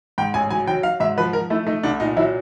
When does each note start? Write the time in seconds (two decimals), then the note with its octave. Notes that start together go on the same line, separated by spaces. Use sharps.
0.18 G#2 G5
0.34 A1 G#5
0.50 F#3 G#5
0.67 F#3 G5
0.83 F#3 F5
1.00 G#2 E5
1.18 F3 B4
1.33 F3 A#4
1.50 A3 E4
1.66 A3 D#4
1.83 C2 D4
2.00 A#2 D#4
2.16 F#3 E4